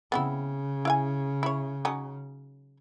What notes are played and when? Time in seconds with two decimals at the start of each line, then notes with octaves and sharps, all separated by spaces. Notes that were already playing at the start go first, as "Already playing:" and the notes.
0.12 C#3 B3 C4 E4
0.85 E4 F5 G#5
1.43 E4 C#5
1.85 F#3 C#4 D#4